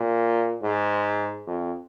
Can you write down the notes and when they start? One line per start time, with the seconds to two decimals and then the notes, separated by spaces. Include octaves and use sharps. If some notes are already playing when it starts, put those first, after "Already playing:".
Already playing: A#2
0.63 G#2
1.47 F2